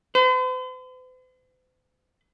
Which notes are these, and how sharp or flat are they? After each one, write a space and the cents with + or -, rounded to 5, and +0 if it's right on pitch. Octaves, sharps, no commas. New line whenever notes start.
C5 -45